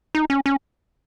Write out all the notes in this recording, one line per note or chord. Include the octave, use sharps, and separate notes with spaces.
D#4
C#4
C#4